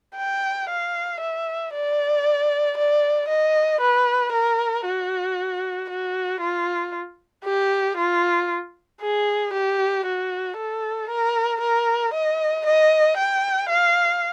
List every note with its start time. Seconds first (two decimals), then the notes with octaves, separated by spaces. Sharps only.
0.16 G5
0.69 F5
1.20 E5
1.73 D5
2.77 D5
3.28 D#5
3.81 B4
4.33 A#4
4.85 F#4
5.90 F#4
6.41 F4
7.45 G4
7.97 F4
9.01 G#4
9.53 G4
10.06 F#4
10.57 A4
11.10 A#4
11.61 A#4
12.14 D#5
12.66 D#5
13.17 G5
13.69 F5